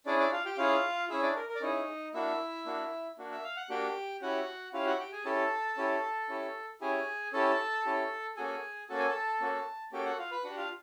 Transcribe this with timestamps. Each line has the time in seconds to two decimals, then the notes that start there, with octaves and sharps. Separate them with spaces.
0.06 C#4 D4 E4 G#4 D5
0.19 D4 D5
0.32 F4 F5
0.45 G4 G5
0.58 C#4 E4 F4 G#4 F5
1.10 C#4 E4 G#4 E5
1.22 D4 D5
1.36 A#4
1.49 A#4
1.55 D5
1.61 C#4 D#4 E4 G#4 D#5
2.14 A#3 D4 E4 F#4 E5
2.66 A#3 D4 F#4
3.18 A#3 D4 F#4
3.31 E5
3.44 F5
3.56 F#5
3.69 A#3 D4 F#4 G4 G5
4.22 C#4 E4 F#4 G4 F#5
4.73 C#4 E4 F4 G4 F5
4.86 F#4 F#5
4.99 G4 G5
5.12 G#4 G#5
5.25 C#4 E4 G4 A4 A5
5.77 C#4 E4 G4
6.29 C#4 E4 G4
6.81 C#4 E4 G4 G#4 G#5
7.33 C#4 E4 G4 A4 A5
7.85 C#4 E4 G4
8.37 A#3 C#4 F#4 G#4 A4 G#5
8.89 A#3 C#4 F#4 A4 A5
8.99 G#5
9.08 A4 A5
9.41 A#3 C#4 F#4 A4
9.92 A#3 C#4 F#4 G4 A4 G5
10.06 F#4 F#5
10.18 F4 F5
10.31 B4 B5
10.44 D4 F#4 G4 F#5
10.57 F4 F5